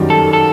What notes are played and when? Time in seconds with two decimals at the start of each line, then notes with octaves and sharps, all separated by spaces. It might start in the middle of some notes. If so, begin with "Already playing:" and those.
Already playing: F#2 D#3 G3
0.10 A4
0.33 A4